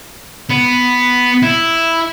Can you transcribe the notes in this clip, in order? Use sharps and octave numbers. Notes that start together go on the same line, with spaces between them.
B3
E4